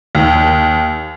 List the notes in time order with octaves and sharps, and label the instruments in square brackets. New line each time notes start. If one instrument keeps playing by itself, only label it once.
[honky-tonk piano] D#2